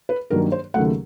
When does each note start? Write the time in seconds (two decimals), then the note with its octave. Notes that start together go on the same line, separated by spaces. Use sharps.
0.09 B4
0.30 G2 D#3 F#3 A#3 A#4
0.52 C5
0.74 D#2 C#3 F#3 A3 F#5